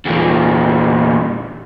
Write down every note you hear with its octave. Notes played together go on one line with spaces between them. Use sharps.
E2 A#2